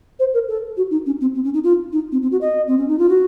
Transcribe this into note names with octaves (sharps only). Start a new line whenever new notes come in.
C5
A#4
A4
F#4
D#4
C#4
C4
C4
C#4
D#4
F4
D#4
C4
C4
F#4
D#5
C4
C#4
D#4
F4
F#4